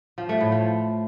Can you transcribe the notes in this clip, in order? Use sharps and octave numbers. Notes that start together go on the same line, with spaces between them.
F3
A3
A2
F3